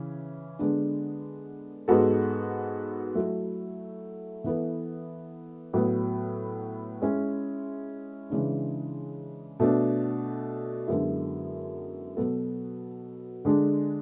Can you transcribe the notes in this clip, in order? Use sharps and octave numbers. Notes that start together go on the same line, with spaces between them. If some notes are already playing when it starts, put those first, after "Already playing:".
Already playing: C#3 E3 C#4
D3 G#3 B3 D4
G#2 G#3 B3 F#4 A4
F#3 A3 E4
E3 B3 E4 A4
A2 F#3 B3
G#3 C#4 E4
C#3 E3 G#3 D4
B2 A3 D4
F#2 D3 G#3 B3 E4
B2 F#3 B3 F#4 A4
D3 G#3 D4